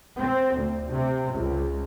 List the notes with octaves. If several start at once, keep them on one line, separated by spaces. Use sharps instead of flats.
C4
D2
C3
C#2